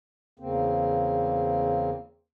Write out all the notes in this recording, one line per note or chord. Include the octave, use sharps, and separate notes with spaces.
E2 C#3 A#3 C4